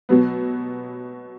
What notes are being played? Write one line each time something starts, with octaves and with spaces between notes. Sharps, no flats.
B2 F#3 B3